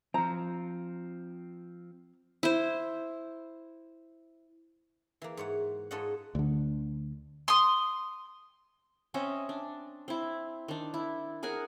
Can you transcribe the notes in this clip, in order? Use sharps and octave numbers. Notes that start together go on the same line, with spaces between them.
F3 C4 A#5
E4 C5
E3 A#3
G#2 C#5 F#5
G#2 F4 A4 C#5 D#5 F#5
D2 D3
C6 D#6
C4 C#4 D#5 E5
D4
C4 E4
D#3 D4
E4
G#4 A#4 F#5 G#5